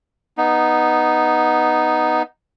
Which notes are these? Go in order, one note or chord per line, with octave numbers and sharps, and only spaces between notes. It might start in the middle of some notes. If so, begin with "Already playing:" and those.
B3 D#4